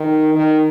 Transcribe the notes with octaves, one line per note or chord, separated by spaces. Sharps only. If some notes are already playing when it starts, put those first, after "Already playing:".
Already playing: D#3
D#3